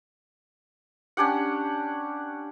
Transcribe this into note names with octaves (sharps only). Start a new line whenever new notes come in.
C#4 D4 G4 F#5